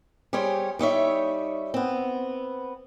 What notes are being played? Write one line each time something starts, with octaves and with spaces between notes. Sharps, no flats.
G3 G4 G#4 C5 C#5
G3 D#4 C#5 E5
B3 C4